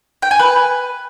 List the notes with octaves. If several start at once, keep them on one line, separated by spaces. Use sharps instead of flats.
G5
G#5
B4